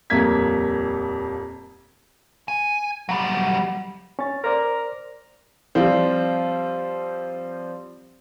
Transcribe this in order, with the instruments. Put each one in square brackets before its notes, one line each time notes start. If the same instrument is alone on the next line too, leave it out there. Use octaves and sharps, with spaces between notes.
[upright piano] D#1 F2 A#3 G#6 B6
[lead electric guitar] G#5
F#3 G3
[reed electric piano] C#4 C#5 A6
[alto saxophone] A#4 [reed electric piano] C5 D5
[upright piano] F3 G3 C4